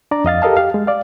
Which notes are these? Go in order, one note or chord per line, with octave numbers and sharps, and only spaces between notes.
D4 D5 A#5
F2 D#5 F5 A6
G4 A4 A#4 D#5 F5 A5
G4 F5
G#3
D5 F5